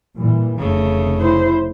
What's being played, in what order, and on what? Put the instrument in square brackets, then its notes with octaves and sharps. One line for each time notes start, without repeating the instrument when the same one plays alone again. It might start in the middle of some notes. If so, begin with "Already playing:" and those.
[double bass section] A#2 E3 G3
[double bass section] F1 [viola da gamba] C#3 A3
[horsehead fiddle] E4 C5